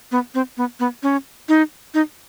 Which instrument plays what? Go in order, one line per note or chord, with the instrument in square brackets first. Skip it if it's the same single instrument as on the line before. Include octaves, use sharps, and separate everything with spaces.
[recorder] B3
C4
B3
B3
C#4
D#4
D#4